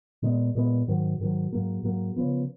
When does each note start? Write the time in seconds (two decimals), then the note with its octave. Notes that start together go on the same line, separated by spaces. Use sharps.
0.22 A#2 G#3 B3
0.55 A#2 G#3 B3
0.88 G#2 D#3 F#3
1.20 G#2 D#3 F#3
1.52 G#2 F#3 A#3
1.83 G#2 F#3 A#3
2.16 C#3 F3 B3